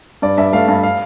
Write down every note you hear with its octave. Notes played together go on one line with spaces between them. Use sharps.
G2 D5
G2 E5
A3 F5
G2 F5
F5